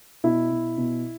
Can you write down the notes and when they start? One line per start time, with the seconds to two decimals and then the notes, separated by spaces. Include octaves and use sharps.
0.24 B2 E4
0.51 B2
0.78 B2